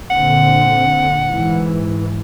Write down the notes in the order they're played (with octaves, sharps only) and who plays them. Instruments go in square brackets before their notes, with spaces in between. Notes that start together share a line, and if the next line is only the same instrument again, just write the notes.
[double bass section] A#2 D3 C4 [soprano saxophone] F#5
[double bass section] G#2 E3